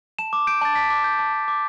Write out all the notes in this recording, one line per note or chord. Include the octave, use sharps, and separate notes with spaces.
A5 E7
D6
G6 D7
A5 A6
A5 B6
D6
G6
A5
A5
D6